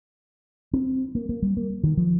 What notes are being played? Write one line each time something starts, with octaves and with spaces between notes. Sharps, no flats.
C4
A#3
A#3
G3
A#3
D#3
F3